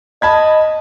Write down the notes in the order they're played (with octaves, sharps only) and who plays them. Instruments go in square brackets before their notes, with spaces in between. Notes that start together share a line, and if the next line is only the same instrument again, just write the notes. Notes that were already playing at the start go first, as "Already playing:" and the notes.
[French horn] D#5 [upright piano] A5 B5 G#6